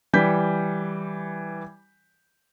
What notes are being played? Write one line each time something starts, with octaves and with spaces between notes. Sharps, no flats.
E3 G3 G6 B6